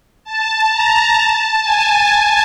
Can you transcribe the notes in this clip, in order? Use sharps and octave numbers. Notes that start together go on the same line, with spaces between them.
A5
A#5
A5
G#5